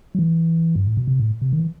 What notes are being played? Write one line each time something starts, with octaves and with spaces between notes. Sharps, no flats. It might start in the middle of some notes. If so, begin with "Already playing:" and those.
F#3
E3
G2
A2
B2
C3
A2
C3
D#3
E3